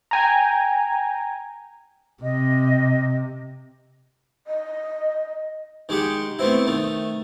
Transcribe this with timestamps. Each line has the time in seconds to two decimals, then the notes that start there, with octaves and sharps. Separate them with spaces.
0.11 G5 G#5 A#5
2.23 C3 D#5
4.47 D#5
5.89 D#3 G#3 G4 F#5
6.39 A3 B3 C4 E4
6.67 D#3 A3